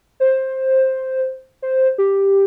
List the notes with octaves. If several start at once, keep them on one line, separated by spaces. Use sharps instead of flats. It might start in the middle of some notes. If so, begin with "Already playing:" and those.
C5
C5
G4